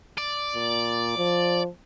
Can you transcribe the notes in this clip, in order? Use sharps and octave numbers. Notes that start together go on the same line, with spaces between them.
D5
A#2
F3